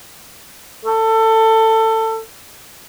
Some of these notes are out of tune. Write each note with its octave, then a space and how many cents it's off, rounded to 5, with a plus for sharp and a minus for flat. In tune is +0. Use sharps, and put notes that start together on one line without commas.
A4 +20